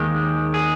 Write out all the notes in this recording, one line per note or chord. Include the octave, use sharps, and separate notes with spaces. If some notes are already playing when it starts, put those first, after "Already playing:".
Already playing: D#2 D#3 G#3 G4
G#4